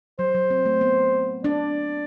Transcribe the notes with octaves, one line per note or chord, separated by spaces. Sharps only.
F#3 C5
F#3
C4
A3
B3
D4 D5